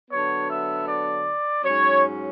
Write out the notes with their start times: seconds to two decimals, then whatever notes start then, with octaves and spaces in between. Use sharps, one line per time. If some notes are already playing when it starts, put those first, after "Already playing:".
0.10 D3 F#3 B3 C#5
0.49 E5
0.87 D5
1.63 G#2 F#3 C#4 C#5